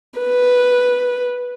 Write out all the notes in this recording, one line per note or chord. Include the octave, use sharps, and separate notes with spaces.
B4